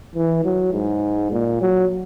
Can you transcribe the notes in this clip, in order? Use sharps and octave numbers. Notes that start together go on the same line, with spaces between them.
E3
F#3
G#2
A#2
F#3